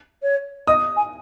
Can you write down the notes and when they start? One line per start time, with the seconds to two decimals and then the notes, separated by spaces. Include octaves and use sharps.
0.22 C#5
0.67 D#5 D#6
0.96 G#5